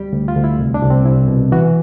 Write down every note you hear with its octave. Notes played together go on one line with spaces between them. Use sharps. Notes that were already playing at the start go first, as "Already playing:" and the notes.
Already playing: D2 G3 G4
D2
F4
D2
E4
C2
D4
C2
C4
C2 E4
B2
E3 F#4